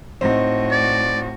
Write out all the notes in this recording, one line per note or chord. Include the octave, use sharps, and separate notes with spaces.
A2 C4 D#4 F#4
D5